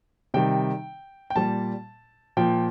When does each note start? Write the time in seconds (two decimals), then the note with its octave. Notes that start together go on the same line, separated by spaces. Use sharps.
0.34 C3 D#3 G3 G5
1.30 G5
1.36 A#2 G3 A5
2.37 A#2 F3 G5